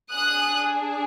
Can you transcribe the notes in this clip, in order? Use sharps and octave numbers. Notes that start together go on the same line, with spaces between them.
D4 G#4 D#6 F#6